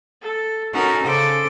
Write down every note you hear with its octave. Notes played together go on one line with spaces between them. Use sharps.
A4
C#4 D#4 F#4 A4 A#4
C#3 A4 C5 D6